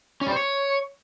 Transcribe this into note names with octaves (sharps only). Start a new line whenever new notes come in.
C#4
G3
C5
C#5